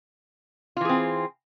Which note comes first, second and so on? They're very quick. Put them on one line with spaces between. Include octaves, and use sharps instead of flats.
F4 E3 G#4 C4